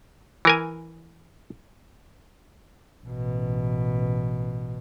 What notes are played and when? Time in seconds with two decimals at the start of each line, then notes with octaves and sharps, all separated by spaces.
0.45 E3 A#4 G#5
3.05 A1 B2